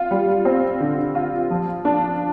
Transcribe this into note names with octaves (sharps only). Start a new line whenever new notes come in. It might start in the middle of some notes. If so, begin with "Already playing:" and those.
Already playing: F4
G3
C4
D3
F4
F3
D4